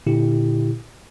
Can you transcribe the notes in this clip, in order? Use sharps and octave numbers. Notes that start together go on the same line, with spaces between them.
A#2 D3 E4 G4